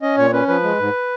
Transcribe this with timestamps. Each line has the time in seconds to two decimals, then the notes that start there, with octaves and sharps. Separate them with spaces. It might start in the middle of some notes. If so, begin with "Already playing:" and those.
0.02 C#4 D#5
0.17 A#2 C#5
0.33 C#4 B4
0.48 F3 B4
0.63 G#3
0.79 G#2